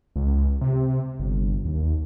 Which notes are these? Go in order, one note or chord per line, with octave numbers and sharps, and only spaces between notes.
C#2
C3
G1
D#2